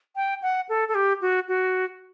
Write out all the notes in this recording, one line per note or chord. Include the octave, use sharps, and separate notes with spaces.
G5
F#5
A4
A4
G4
F#4
F#4